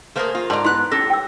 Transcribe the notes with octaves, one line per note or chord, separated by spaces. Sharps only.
A3 A#3 G#4 A#4 C5
F4
G#2 D5 A5 A#5 C6
B3 E4 C6 F#6
C#4 G4 A4 A#6
G5 E6